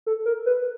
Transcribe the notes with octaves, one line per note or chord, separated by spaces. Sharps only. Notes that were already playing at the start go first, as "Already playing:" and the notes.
A4
A#4
B4